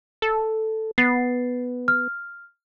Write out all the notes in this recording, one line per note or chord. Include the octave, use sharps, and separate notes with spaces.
A4
B3 A6 C7
F6